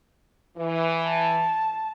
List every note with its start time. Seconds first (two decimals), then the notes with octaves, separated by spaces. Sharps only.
0.57 E3
1.07 A5